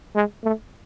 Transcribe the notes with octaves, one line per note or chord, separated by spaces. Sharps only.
G#3
A3